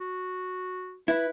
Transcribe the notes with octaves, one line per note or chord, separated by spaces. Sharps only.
F#4
E4 B4